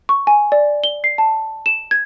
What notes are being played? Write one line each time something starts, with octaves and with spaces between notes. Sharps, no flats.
C#6
G#5
D5
G7
C7
A5
E7
G#6